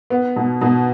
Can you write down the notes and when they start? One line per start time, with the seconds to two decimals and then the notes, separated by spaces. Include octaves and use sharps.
0.10 B3
0.36 B2
0.61 B2